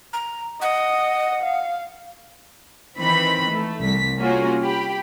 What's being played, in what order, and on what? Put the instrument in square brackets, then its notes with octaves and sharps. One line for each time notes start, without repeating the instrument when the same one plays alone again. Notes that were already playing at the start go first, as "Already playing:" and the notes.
[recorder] A#5
[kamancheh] D#5 [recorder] F#5
[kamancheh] F5
[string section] D#3 E3 C4 B5
A3
C2 B6
A#3 C#4 F4 F#4 G#4
G4 B5